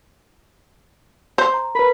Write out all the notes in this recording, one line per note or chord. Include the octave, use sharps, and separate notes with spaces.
C5
A#5
A#4 B4 B5